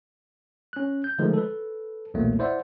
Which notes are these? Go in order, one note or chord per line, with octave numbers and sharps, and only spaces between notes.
C#4 F#6
G6
D3 D#3 F3 G#3 A3
A4 B4
B1 E2 A#2 A3 A#3
E4 C5 D5 E5 F#5